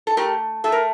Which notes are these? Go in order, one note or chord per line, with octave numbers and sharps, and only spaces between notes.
A4
A3 G4 A#4
A3 A4
A#4